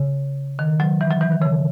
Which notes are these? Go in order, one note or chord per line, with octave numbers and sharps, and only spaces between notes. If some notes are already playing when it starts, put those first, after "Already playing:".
Already playing: C#3
D#3
F#3
E3
F#3
E3
D#3
C#3